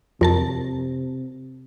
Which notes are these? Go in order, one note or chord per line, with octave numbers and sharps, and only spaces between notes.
F2 C3 A#4 A5